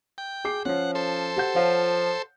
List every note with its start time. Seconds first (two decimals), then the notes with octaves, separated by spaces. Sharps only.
0.18 G5
0.45 G#4 D6 C7
0.65 F3 C#4 C#5 F#5
0.95 A4 C5
1.37 G4 F#5 G6
1.55 F3 C#5 F5 F#5